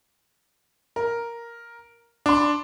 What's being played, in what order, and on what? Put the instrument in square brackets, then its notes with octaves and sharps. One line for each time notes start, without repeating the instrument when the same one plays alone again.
[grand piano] A#4
[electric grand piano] D4 [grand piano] C6 D6